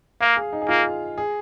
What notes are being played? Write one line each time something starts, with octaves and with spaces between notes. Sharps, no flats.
A#3 F5
G#4
D#4
G#4
A#3 F4
G#4